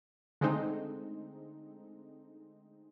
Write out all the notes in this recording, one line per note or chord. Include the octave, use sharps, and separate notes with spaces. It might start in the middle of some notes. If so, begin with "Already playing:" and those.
D3 G#3 A3 C4 D#4